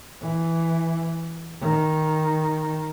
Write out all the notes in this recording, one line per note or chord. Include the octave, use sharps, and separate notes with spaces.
E3
D#3